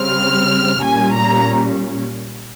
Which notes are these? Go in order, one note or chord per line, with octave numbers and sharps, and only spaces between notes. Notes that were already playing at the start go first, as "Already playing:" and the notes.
Already playing: C#3 G3 C4 F6
A#2 G3 C#4 G#5
A#5